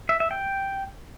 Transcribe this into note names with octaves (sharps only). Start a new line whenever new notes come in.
E5
E5
G5